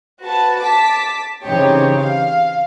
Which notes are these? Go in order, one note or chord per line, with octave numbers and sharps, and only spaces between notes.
F#4 B4 A5
A5 D6 B6
C#3 E3 C4 D#4 G4 C#5
F5